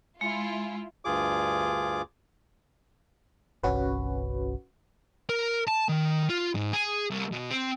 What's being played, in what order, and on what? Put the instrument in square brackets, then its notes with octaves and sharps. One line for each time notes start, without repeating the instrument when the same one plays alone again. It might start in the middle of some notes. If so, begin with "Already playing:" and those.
[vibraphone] G#3 [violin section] E4 F4
[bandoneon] D2 G2 F4 G#4 D6
[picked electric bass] G1 C2 [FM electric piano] C#4 F#4 B4
[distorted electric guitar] A#4
A5
D#3
F4
G#2
G#4
C2
B2
C4